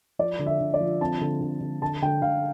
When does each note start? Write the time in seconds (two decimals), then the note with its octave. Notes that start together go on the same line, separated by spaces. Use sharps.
0.19 F3 D5
0.39 D3
0.46 E5
0.61 D3
0.74 D5
0.81 F3
1.00 C4 A5
1.21 D3
1.41 D3
1.61 D3
1.82 D3 A5
2.02 D3 G5
2.22 D3 F5